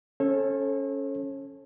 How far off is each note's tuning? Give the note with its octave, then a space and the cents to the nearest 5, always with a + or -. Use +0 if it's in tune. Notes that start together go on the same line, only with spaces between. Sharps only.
C#4 +0 A4 -10 C#5 -45